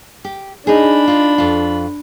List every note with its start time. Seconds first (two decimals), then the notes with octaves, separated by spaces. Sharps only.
0.25 G4
0.67 D4 D#4 G#4 B5
1.08 D#4 F4
1.38 F2 F4